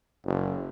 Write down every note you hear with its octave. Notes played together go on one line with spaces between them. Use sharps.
F#1